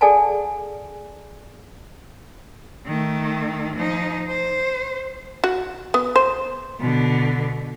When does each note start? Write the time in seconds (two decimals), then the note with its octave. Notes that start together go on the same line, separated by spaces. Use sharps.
0.01 G#4 A4 D5 F#5 G#5 A5
2.86 D#3 A3
3.76 F3 D#4
4.28 C5
5.44 F#4
5.94 B3
6.16 C5
6.80 B2 D3